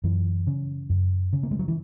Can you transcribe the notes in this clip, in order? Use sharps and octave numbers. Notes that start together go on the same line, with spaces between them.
F#2 E3
C#3
F#2
C#3
A#3
G#3
F#3
E3